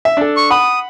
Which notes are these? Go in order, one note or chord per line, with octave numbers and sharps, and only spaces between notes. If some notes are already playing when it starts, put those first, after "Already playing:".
E5
D4 A4
C#6
F#5 B5 D#6